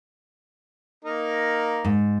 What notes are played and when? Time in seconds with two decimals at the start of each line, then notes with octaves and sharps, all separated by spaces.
1.05 A#3 D#4 A#4
1.85 G#2